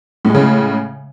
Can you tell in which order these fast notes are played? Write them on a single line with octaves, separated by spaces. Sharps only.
A2 G#3 C#3